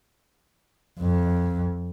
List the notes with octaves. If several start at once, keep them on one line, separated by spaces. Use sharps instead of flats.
F2